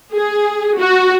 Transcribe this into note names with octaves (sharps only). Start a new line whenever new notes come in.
G#4
F#4